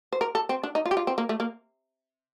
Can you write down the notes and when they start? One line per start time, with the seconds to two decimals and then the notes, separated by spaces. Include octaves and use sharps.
0.12 C5
0.21 A#4
0.35 A4
0.49 C4
0.63 D4
0.75 D#4
0.86 F4
0.91 G4
0.97 F4
1.07 C4
1.18 A#3
1.29 A3
1.40 A#3